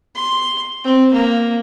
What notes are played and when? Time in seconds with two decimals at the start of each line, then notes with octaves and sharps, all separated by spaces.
0.15 C6
0.84 C4
1.13 A#3